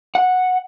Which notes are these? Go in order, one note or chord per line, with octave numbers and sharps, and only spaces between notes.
F#5